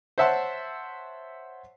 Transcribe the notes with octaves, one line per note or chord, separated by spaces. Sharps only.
C5 C#5 E5 F#5 A5 C6